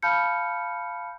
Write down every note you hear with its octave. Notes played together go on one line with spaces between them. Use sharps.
F5 A5 B5 F6 G6 C#7